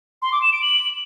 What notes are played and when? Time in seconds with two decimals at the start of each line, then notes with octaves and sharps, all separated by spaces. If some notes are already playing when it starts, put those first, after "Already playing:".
0.22 C6
0.32 D6
0.42 E7
0.52 D7
0.63 F#7